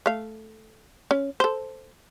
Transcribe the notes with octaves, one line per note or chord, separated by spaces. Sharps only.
A3 F5
C#4
A4 C5